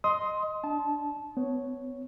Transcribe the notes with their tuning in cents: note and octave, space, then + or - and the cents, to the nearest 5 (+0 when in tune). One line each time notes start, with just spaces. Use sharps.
D#5 +0 C6 +0 D#6 +25
D4 +0 A5 -20
B3 +30 C#5 +0